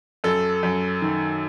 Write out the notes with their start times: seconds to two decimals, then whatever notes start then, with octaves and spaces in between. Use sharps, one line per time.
0.24 F#2 A4
0.63 F#2
1.02 D#3